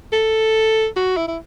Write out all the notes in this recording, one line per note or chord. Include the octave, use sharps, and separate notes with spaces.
A4
F#4
E4
E4